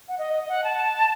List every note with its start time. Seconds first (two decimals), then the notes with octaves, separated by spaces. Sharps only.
0.08 F#5
0.18 D#5
0.34 D#5
0.49 F#5
0.64 A5